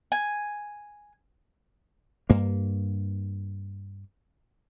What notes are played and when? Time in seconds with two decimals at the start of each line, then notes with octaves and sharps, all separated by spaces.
0.12 G#5
2.30 G2 A#3